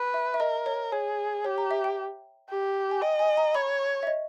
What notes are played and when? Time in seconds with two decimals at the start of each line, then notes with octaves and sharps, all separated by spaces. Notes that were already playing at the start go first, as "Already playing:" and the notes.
Already playing: B4
0.14 E5
0.34 E5
0.40 A#4 D#5
0.66 C#5
0.92 G#4 C#5
1.45 G4 C#5
1.58 A#5
1.71 E5
1.84 G5
2.49 G4
2.91 G#5
3.02 D#5 G5
3.19 G#5
3.37 A#5
3.54 C#5 B5
4.03 E5
4.07 D#5